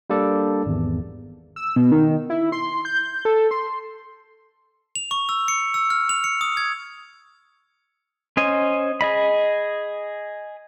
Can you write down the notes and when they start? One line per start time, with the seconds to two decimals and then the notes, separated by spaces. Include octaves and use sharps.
0.10 G3 A#3 D4 A4 D5
0.66 G#1 E2
1.56 E6
1.76 B2
1.92 D#3
2.30 E4
2.52 C6
2.85 G6
3.25 A4
3.51 C6
4.95 F7
5.11 C#6
5.29 E6
5.48 C#7
5.74 E6
5.90 F6
6.09 F7
6.24 C#7
6.41 D#6
6.57 G#6
8.37 C#4 C5 D#5 G#5
9.01 G#4 D#5 B5